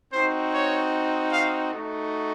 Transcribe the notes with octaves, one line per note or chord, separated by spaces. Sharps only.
C4 D#4 F#4 C5
C#5
F5
A3 D#4 F#4